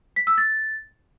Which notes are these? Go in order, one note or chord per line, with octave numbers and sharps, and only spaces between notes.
B6
E6
A6